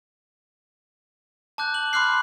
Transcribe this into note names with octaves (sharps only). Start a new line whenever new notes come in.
A5 D6 F#6 G6
F#7
B5 C6 D6 F6 F#6 C7